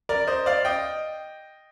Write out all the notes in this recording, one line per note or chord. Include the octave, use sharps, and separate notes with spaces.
A#4 D5
C5 D#5
D5 F5
D#5 G5